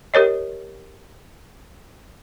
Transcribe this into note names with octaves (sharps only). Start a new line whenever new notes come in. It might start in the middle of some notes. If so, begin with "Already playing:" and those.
G4 A#4 C#5 D#5